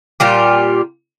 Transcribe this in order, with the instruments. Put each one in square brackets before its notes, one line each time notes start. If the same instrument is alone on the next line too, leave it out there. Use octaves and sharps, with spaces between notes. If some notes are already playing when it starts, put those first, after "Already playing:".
[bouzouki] A#2 G3 F4 G4